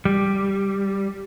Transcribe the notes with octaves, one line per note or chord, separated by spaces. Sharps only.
G3